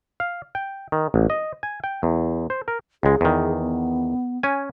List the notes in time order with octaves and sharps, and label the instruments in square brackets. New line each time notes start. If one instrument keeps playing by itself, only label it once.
[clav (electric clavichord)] F5
G5
D#3
A1
D#5
G#5
G5
E2
C5
A#4
[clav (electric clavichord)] C#2 G#3 [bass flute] G#4
[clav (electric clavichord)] E2 D#3
[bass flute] B3
[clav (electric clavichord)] C#4 G#5